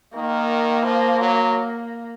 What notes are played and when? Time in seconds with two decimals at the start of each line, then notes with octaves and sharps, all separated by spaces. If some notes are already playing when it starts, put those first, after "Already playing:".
0.15 D#3 A#3
0.85 F3
1.20 F#3